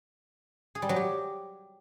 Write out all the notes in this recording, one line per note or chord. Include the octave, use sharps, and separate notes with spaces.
G#4
G3
F#3
G4